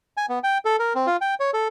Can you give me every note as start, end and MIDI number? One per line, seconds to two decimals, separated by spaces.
0.17 0.26 80
0.29 0.39 59
0.44 0.58 79
0.65 0.76 69
0.80 0.93 70
0.95 1.07 60
1.07 1.16 65
1.21 1.35 79
1.40 1.51 73
1.54 1.68 69